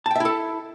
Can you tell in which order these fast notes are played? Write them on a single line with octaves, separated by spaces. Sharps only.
A5 G5 E5 E4 A4